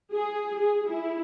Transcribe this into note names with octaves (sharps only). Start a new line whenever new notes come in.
G#4
G#4
E4